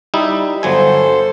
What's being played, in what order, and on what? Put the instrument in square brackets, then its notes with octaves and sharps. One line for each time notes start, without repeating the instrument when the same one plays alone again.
[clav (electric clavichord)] G3 D#4 E4
[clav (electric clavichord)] G1 F#3 G#5 [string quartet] A4 C5